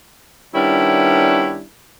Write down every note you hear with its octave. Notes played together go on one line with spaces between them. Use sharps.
D#3 G3 B3 C#4 D4 E4